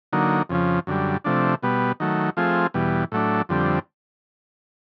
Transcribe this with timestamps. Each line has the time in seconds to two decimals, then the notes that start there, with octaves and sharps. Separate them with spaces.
0.13 D3 F#3 A#3 D#4
0.49 F2 C#3 F3
0.87 F#2 D3 G3
1.25 C3 F3 A3 D4
1.63 B2 G3 B3
2.00 D#3 F#3 A3
2.37 F3 A3 C4 F4 G#4
2.74 E2 B2 G3
3.12 A2 F#3 A3 D4
3.49 F2 D3 G3 C4